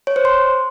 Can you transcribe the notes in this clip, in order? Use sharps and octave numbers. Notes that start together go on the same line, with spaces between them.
C#5
C5
C6